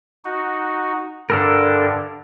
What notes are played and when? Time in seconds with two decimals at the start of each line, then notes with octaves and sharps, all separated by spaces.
0.25 D#4 F#4
1.30 G2 D3 D4 A4 A#4